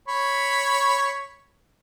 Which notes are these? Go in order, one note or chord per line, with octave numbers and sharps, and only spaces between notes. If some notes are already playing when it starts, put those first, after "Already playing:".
C#5 B5